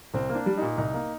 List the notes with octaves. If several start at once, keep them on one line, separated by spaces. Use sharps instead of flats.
C2 C4
A#3
D4
G3
A#2 D#4
C2 D#4
A#3